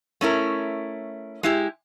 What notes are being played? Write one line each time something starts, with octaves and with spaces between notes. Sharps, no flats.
A3 C#4 E4 A#4
G#3 E4 G4